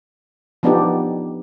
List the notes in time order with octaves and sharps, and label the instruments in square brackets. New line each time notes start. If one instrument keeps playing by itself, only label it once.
[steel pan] F3 B3 D4 D#4 G4